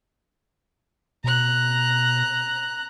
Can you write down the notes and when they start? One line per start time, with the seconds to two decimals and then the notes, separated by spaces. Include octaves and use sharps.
1.24 B2 A#5 F#6